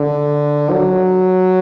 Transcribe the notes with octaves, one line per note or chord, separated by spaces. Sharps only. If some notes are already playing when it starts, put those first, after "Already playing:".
Already playing: D3
F#3